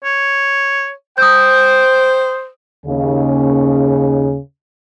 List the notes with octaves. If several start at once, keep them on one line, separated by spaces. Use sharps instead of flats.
C#5
C5 G5 D#6 E6 G6
D#2 C#3